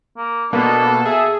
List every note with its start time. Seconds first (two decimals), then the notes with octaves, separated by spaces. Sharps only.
0.17 A#3
0.53 B2 A#3 B3 D4 A4
1.06 G#4 E5